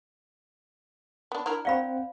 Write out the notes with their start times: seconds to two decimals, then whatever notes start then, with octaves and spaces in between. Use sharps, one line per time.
1.32 B3 D4
1.46 D4 E4 A#4
1.65 C4 D5 F5 F#5 B5